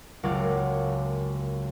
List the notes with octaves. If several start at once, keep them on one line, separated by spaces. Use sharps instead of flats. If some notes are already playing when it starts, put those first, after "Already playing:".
F#1 C#2 A#4 F#5 D6 G#6